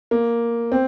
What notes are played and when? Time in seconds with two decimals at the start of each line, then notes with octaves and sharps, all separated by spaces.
0.11 A#3
0.72 C4